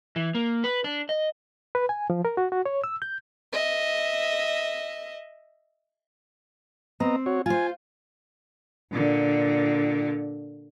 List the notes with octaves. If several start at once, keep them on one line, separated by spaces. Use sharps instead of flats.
E3
A#3
B4
D4
D#5
B4
G#5
F3
A#4
F#4
F#4
C#5
E6
G6
D#5 E5
B3 C4 D#5 A#5
F#4 C#5
F4 C5 G#5
A#2 D3